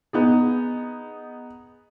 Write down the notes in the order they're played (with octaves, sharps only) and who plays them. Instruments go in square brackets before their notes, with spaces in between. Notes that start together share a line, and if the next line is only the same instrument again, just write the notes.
[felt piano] B3 D#4 G#4